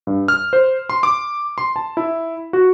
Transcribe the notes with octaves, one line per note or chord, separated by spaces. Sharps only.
G2
F6
C5
C6
D6
C6
A5
E4
F#4